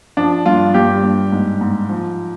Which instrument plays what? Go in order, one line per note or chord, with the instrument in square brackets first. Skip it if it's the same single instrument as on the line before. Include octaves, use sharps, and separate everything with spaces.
[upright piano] F3 D4
G2 F4
G2 G4
G2
G#2
G#2
F3